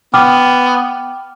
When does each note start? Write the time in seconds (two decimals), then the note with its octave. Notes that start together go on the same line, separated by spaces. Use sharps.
0.14 B3 G5 D6 F6